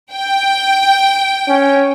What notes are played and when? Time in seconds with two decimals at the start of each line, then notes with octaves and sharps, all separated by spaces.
0.13 G5
1.49 C#4